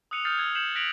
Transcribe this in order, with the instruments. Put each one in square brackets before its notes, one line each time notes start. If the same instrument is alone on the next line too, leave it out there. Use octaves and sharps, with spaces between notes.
[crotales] D#6 E6 F#6 C#7 D#7 F7
D#6 F6 G6 A6 C7
E6 G#6
G6 C7 C#7 E7 F#7
F#6 A#6 B6 D7 F7 F#7